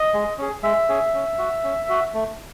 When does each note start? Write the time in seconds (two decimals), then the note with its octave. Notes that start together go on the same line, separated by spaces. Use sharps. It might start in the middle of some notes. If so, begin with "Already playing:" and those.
Already playing: D#5
0.14 G#3
0.38 C#4 G#4
0.63 G#3 E5
0.89 C#4 G#4
1.14 C#4
1.38 F#4
1.63 C#4
1.89 F#4
2.14 A3